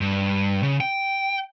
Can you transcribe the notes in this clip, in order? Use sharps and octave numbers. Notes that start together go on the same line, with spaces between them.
G2
C#3
G5